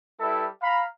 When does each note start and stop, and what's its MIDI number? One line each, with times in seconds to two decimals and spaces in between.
0.20 0.46 55
0.20 0.46 64
0.20 0.46 69
0.20 0.46 71
0.20 0.46 76
0.62 0.85 77
0.62 0.85 82
0.62 0.85 83